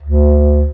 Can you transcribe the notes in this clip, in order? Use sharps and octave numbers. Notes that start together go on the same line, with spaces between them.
D2